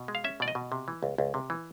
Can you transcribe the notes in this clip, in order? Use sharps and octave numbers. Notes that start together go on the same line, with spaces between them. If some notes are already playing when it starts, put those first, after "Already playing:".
Already playing: B2
G#3
F5
C#4 E5
B2 D5
D#5
B2
C3
E3
C#2
C#2
C3
E3